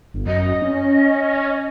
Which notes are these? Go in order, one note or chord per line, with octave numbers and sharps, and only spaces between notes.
G1
F#2 D#5
C#4